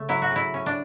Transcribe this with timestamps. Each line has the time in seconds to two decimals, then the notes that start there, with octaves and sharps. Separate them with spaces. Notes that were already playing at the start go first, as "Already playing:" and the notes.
Already playing: C#3 A3
0.09 F#3 E4
0.22 F#4
0.31 C#3
0.36 E4
0.54 C#4
0.66 D4